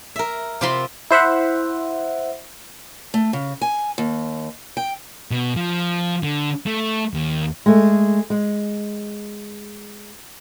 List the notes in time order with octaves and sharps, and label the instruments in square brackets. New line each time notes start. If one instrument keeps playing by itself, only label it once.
[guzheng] A#4 E5
C3 C4 F4 B5 C6
[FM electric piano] E4 C5 E5 F#5
[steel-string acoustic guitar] A3
C#3
G#5
D#2
G5
[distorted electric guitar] B2
F3
D3
A3
D#2
[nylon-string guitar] G#3 A3
G#3